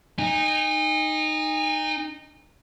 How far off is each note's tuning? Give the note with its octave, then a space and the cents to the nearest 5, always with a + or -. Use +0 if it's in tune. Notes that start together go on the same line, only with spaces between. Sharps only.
D#4 -10 G#5 -35